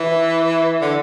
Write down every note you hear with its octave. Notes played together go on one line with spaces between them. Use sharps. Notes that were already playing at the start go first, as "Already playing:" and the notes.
Already playing: E3
D3